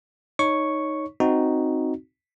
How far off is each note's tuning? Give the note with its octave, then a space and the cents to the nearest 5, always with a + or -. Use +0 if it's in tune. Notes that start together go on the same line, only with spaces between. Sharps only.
D#4 +0 C#5 +0 C#6 +0
C4 +0 D#4 +0 F#4 +0